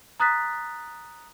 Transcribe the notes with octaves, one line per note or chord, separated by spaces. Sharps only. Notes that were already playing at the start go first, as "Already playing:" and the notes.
A#5 D#6 F#6 A6 B6